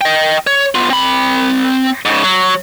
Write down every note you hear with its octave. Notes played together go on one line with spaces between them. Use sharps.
D#5 G5
C#5
B3 F4
C4 B5
G#2 C#3
F#3